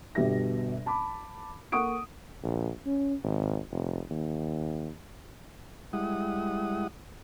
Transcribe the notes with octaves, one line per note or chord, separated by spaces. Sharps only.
G1 B2 G4 E5 A#6
A5 B5 D6
A#3 A4 F#5 C#6 D#6 D7
A#1
C#4
G#1
F1
D#2
G3 G#3 E4 F#5 D#6